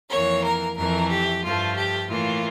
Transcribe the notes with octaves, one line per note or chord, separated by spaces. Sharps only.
F2 E3 A#3 C#5
A#4
F2 E3 A3 A#4
G4
G2 F3 A3 F4
G4
A2 E3 A#3 F4